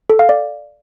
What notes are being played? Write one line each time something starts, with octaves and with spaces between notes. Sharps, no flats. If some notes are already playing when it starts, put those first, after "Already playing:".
A4
F5
D5